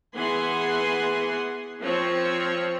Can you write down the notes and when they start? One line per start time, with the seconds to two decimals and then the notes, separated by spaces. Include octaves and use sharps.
0.15 E3 B3 G#4 F#5 G#5 C6
1.80 F3 C4 C#5